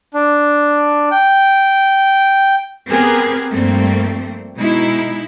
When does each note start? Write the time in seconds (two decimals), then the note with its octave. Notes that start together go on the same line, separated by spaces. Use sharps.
0.14 D4
1.11 G5
2.90 B3 C4 G4 G#4 A#4 B4
3.51 G2 F3 A3 A#3 C4
4.55 B2 G#3 D#4 E4